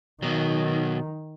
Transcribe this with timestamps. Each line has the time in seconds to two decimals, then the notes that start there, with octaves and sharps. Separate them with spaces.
0.22 B2 D#3 F#3